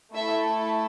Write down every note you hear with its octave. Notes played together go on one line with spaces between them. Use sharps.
A3 E4 A4 E5